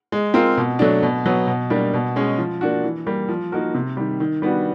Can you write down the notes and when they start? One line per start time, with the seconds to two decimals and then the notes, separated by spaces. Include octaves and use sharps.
0.12 G#3
0.34 C4 F4 A#4
0.57 B2
0.79 F#3 A3 D4
1.02 B2
1.26 F#3 B3
1.47 B2
1.70 G3 A#3 D4
1.94 B2
2.16 G#3 C#4
2.38 F3
2.61 A#3 D4 F#4
2.84 E3
3.07 G3 A#3
3.29 F3
3.52 A#3 D#4 F#4 A#4
3.75 C3
3.97 D#3 G3
4.20 D#3
4.42 G3 B3 D4 F#4